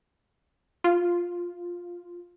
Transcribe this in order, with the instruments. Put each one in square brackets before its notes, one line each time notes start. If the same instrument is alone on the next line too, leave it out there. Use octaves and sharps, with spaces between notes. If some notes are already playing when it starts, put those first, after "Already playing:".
[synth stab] F4